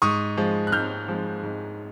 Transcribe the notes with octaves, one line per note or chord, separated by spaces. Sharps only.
G#2 C#6 D#6
F3 G#3
F#6
G#2 F6 G6
F3 G#3
G#2